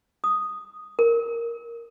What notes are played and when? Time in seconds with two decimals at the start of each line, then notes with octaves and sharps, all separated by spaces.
0.24 D#6
0.99 A#4